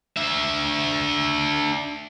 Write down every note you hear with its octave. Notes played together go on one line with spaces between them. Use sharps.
D4 E5